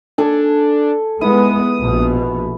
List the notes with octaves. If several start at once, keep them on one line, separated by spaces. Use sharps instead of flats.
D4 A4 G#5
G#3 B3 E4 D#6
A#1 B2